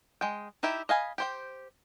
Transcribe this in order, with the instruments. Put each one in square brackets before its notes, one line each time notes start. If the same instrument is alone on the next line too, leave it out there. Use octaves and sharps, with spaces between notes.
[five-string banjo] G#3 G5
D#4 E4 G4 E5
D#5 F5 G#5 B5
G4 C5 G5